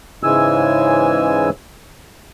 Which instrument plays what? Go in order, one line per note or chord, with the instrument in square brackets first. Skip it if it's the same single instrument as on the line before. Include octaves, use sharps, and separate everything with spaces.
[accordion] G#2 C#3 E3 G#3 G#5 E6